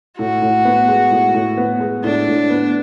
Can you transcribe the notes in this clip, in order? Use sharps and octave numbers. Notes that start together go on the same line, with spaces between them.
A2 F#4
A2
B3
G#3
A2
A2
B3
G#3
A2 D4
A2
B3